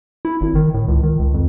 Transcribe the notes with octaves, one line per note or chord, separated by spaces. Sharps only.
E4
G#1
D#3
A2
C#2
D#3
C#2
F2